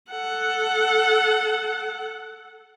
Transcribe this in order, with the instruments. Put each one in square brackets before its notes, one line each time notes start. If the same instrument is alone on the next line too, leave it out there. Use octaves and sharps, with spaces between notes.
[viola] A4 F#5